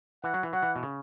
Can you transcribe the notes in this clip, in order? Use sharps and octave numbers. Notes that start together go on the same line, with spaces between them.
E3 F#5
F#3
E3
F#3 F#5
E3
B2
C#3